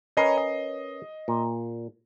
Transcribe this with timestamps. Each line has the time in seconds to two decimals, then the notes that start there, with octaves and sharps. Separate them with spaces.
0.17 C#4 A#4 B4 C#5 D#5 C7
0.38 D#5
1.28 A#2